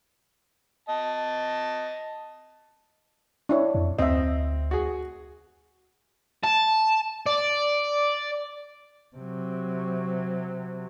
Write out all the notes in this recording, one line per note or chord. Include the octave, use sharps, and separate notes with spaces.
D#5 A5
D4 E4 C#5
F2
D2 C4 D#5 E5
F#4 G#4
A5
D5
C3 F#3